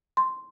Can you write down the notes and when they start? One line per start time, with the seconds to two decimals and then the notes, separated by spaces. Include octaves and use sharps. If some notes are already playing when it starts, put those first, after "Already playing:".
0.17 C6